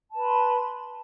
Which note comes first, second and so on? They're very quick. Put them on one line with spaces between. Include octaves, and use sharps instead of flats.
A5 B4 B5 C6